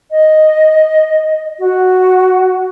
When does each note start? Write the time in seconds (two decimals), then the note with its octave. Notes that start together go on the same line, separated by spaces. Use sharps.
0.11 D#5
1.59 F#4